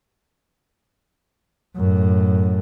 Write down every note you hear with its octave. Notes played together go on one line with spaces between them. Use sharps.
F#2 A2